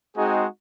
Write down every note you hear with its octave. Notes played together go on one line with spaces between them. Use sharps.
G#3 C4 D#4 F#4 G#4